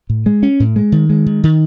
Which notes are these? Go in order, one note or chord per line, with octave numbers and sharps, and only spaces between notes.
A2
G#3
C#4
A2
G#3
D#3
G#3
D#3
D#3